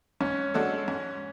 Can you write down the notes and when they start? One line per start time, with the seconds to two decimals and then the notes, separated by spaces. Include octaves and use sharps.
0.20 G#2 C#4
0.54 G#3 D4 F#4 A4
0.88 G#2